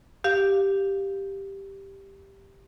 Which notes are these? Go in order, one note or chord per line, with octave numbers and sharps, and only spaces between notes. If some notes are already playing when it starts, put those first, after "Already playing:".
G4 F5